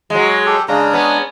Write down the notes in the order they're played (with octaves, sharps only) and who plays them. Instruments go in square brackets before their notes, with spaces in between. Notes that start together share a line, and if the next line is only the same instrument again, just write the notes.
[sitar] F#3 G#3
[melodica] G4 A4
[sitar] C#3 [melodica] G#3 D4 A#5
[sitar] B3 C#4